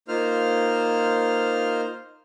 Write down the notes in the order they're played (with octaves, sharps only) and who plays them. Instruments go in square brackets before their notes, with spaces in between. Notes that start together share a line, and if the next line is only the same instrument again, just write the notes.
[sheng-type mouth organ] A#3 D#4 F4 C5 F6